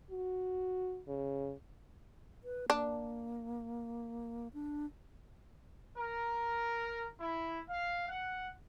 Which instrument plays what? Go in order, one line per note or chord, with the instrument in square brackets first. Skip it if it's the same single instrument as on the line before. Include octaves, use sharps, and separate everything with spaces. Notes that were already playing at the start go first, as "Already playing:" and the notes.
[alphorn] F#4
C#3
[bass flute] B4
[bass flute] A#3 [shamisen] D4
[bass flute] D4
[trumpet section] A#4
E4
F5
F#5